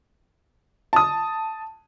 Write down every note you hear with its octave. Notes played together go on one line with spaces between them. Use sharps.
A5 D#6